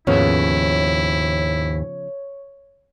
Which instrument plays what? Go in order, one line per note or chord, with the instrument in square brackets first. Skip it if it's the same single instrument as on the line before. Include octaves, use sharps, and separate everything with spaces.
[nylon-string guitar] D#2 G#2 [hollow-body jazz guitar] C#3 F3 B3 [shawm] E4 [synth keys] C#5